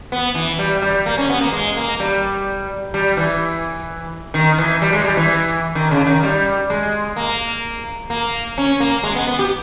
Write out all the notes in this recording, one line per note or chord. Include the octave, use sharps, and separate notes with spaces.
B3
E3
G3
G3
A#3
C#4
B3
A#3
G#3
A#3
G3
G3
E3
D#3
E3
G3
G#3
G3
E3
D#3
C#3
D#3
G3
G#3
A#3
A#3
C#4
A#3
G#3
B3
B3
G4